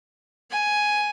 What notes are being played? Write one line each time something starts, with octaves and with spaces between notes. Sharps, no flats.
G#5